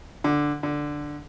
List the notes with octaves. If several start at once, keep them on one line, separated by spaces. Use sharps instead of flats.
D3
D3